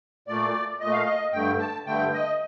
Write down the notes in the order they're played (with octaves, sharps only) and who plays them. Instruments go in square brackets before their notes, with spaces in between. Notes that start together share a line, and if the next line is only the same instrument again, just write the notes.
[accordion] A#2 A3 D5
A#2 D#5
A3
F5
D#5
G2 D3 A3 G5
A5
G2 D3 A3 G5
D#5